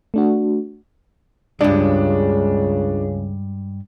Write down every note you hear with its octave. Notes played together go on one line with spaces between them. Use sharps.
A3 D4 F#4
C#2 G2 C#3 G#3 D4